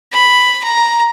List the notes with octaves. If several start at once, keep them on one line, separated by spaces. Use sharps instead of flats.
B5
A#5